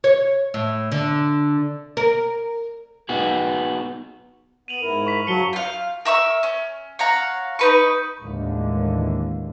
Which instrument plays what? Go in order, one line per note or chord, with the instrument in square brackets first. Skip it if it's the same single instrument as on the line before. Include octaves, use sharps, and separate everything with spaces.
[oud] C#5
A2
D3
A#4
[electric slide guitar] B3 D#4 F#4 G#4
[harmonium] B3 [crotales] D#7 F7 F#7
[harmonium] G#2 E4 A#4
[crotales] C#6 B6
[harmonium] F#2 C#3 A5 [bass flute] F#3 [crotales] C#7 G7
[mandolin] F4 F5
A#4 E5 C#6 E6
C#4
C#5 F5 F#5 A#5
D#4 B4 C#6
[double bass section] D#2 A2 D3 E3 G#3 A#3